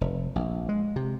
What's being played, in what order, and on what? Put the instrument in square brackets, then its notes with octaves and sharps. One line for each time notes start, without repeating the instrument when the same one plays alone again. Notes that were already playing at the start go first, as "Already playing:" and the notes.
[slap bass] F1
A#1
G#3
C3